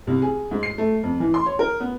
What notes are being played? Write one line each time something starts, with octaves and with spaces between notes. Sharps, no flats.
C2
G#4
G#2
C7
A3
F2
E3
C6
C#5
A#4
B3